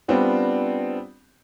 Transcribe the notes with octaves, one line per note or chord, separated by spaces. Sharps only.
G3 B3 C4 D4 F4